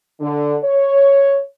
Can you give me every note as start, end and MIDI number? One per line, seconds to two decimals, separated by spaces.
0.21 0.56 50
0.63 1.39 73